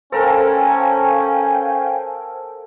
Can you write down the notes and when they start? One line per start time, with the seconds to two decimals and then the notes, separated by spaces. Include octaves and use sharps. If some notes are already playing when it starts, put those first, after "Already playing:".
0.12 C#4 A4 A#4 C5 F5 G5 G#5